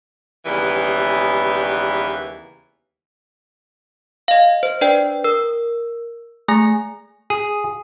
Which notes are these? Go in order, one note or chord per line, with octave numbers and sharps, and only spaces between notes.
D#2 C#3 E3 G3 B3
D#5 F5
C5
D4 B4 D5 G5
A#4 E6
A3 G#4 G#5 A#6
G#4